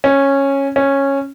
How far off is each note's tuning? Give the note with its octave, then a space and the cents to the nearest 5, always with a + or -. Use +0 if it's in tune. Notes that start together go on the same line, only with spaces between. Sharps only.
C#4 -10
C#4 -10